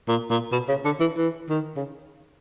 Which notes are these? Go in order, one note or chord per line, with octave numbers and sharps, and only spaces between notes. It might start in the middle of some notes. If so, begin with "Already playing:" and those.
A#2
A#2
B2
C#3
D3
E3
E3
D#3
C#3